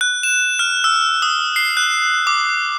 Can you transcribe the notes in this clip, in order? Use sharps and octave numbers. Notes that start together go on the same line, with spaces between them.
F#6
E7
F6
E6
D#6
C7
F#6
D6